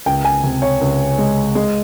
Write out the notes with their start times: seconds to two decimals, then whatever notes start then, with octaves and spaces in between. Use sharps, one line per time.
0.06 C#2 G5
0.25 G#5
0.43 C3
0.62 C#5
0.81 C#2
1.18 G#3
1.55 G#3